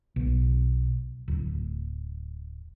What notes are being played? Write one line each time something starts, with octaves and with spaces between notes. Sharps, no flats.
B1
D1